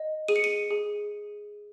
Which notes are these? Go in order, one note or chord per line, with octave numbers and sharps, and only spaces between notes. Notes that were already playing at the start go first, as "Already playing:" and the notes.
Already playing: D#5
G#4 D#7
C#7
D#7
G#4